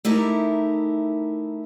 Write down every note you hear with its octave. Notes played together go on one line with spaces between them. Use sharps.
A3 D#4 E4 G4 A#4